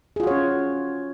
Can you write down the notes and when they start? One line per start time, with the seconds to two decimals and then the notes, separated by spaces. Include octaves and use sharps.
0.16 G#4
0.20 F4
0.23 F#4
0.27 C#5
0.31 C#4